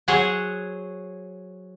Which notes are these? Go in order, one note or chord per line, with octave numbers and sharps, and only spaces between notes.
F#3 G#4 C5 C#5 F#5